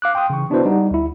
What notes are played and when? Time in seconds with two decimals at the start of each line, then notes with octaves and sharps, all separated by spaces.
0.02 F5 D6 F#6
0.15 G5 C6 D#6
0.30 C#3 E3 C#6
0.50 B3 D4 E4 F#4 B4 C5
0.65 G3 D#4 F#5
0.91 D2 E4